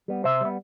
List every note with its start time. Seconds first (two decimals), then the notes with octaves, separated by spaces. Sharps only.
0.08 G3 B3
0.24 C3 C5 E5
0.41 G3 B3